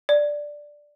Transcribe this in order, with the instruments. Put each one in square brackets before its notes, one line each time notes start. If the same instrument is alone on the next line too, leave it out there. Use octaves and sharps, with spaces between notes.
[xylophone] D5